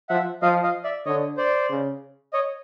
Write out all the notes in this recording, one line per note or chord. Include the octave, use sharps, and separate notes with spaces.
F3 E5 F#5
F3 D#5 F5
D#5 F5
D5 E5
D3 C#5 D#5
C5 D5
C#3
C#5 D#5